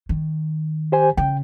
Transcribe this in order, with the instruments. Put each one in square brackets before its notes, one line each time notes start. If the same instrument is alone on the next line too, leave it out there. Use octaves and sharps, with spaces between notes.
[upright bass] D#3
[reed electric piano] G4 C5 G#5
[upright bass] C#3 [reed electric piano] G5